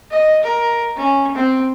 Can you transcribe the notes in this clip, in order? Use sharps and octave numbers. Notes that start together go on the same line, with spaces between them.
D#5
A#4
C#4
C4